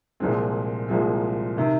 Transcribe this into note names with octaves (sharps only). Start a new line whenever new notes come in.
C2 A#2 F3 G#3 C4
C2 A#2 F3 G#3 C4
C3 D#3